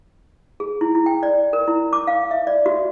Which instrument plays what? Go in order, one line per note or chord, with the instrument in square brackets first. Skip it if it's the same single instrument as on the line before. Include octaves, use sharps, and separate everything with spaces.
[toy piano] G#4
E4
E4
G5
D5
A#4
E4
D6
F5
E5
D5
F#4